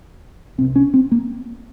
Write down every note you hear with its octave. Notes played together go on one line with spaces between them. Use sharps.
C2 C3 C4
C#4
C4
A#3